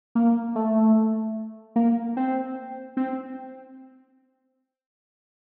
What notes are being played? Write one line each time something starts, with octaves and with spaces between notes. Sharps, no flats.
A#3
A3
A#3
C4
C4